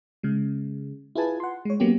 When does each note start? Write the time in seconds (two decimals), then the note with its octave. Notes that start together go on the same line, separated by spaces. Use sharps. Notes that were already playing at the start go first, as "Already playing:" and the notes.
0.23 C#3 G#3
1.15 E4 F4 G#4 B4 G#5 A5
1.40 F#5 C6
1.65 G#3 C#5
1.80 F#3 A#3 B3 C#4 G4